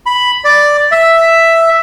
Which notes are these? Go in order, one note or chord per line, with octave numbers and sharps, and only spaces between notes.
B5
D5
E5